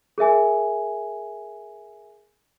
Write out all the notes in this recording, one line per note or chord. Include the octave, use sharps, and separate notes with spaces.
G#4 A#4 E5 G#5